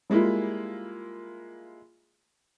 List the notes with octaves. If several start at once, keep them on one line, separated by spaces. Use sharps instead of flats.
G3 G#3 A#3 E4 F4